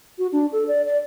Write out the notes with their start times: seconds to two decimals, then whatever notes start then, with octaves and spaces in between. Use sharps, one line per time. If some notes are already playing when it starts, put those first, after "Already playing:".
0.18 F#4
0.32 D4
0.52 A4
0.68 D5
0.85 D5